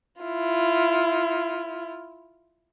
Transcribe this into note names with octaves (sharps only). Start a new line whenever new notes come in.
E4 F4